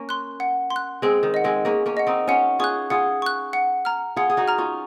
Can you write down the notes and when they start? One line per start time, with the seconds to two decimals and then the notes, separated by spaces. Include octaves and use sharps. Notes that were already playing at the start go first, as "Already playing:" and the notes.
Already playing: A#3 C#4
0.09 C6 F#6
0.40 F#5
0.70 C6
0.76 F#6
1.02 G#3 C4 G#4
1.23 D#3
1.34 D#5 F#5
1.44 G#3 C4
1.65 A#3 C#4 G#4
1.86 A#3 C#4
1.97 D#5 F#5
2.07 C4 D#4
2.27 C#4 F4 F#5
2.59 F4 G#4 C#6 F#6
2.90 F4 G#4 F#5
3.22 C#6 F#6
3.53 F#5
3.85 A#5 F6
4.16 F4 G#4 F#5
4.30 G#4
4.37 D#4 F#4
4.48 A#5 F6
4.58 C#4 F4